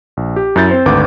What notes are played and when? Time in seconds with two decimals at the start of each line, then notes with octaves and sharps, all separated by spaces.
0.17 A#1
0.36 G4
0.56 F#2 E4 G6 A6
0.71 C4 C5
0.86 G#1 D2 B4 D6 A6